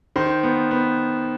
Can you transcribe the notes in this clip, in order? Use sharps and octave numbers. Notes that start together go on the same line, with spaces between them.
D#3 C5
B3
B3